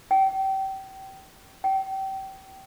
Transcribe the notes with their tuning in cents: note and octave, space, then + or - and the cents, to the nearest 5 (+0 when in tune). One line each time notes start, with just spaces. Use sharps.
G5 -30
G5 -30